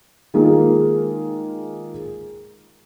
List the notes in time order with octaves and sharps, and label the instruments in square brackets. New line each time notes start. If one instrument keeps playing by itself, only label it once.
[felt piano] D#3 G#3 A#3 F4 G#4